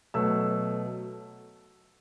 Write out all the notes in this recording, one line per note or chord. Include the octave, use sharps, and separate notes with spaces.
B2 F#3 A3 E6